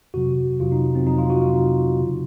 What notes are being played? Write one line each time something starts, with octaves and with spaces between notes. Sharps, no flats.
F2 C3 F#3 F#4
F2 C3 F#3 F4
D#4
C4
F2 C3 F#3 D#4
F4
F#4
F4
F2 C3 F#3 D#4
F#2 C#3 F#3